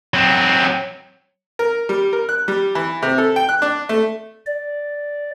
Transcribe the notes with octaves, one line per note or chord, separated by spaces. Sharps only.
F#3 C4
A#4
G3
A#4
F#6
G3
E3
C3
A4
G5
F#6
D4
A3
D5